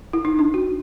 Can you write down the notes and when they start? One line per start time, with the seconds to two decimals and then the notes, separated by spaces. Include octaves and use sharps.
0.13 E4
0.25 D#4
0.39 D4
0.54 F#4